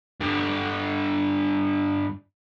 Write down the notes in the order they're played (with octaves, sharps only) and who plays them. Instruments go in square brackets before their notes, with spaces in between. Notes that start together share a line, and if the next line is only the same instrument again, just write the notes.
[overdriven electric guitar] G2 D3